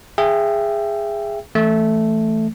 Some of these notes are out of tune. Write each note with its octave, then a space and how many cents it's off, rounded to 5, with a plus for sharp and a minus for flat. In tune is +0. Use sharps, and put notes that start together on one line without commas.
G#4 -15 E5 +20 G5 +0
E3 +0 A3 +0